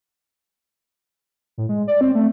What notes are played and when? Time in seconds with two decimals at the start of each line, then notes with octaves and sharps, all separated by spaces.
1.58 A2
1.69 G#3
1.88 D5
2.01 C4
2.15 A3